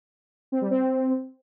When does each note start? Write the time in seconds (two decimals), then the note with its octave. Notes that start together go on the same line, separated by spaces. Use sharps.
0.52 C4
0.61 G3
0.71 C4